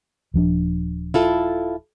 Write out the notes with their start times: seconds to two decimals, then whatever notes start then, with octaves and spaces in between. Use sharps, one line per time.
0.34 D#1 F3 D4
1.14 E4 F4 A4